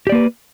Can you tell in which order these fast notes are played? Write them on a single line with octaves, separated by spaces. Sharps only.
G4 D5 A#3 B4